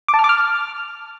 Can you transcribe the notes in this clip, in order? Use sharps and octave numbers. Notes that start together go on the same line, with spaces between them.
D6
A5
F6
D6
F6